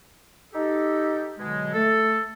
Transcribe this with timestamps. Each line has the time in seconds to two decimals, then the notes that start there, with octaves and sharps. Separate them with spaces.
0.54 D#4 G4 A4
1.39 B2 D3 F#3 G#3
1.73 A3 A4